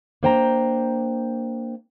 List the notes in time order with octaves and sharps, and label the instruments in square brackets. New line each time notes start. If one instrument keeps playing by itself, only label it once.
[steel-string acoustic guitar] A#3 D4 C5 G5 A5 A#5